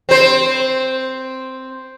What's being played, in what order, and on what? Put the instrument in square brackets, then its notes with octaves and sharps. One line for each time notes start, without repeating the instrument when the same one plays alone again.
[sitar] C4 C5